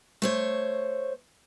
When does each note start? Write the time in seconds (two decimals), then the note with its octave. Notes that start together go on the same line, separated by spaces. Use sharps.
0.22 A3 C5 C#5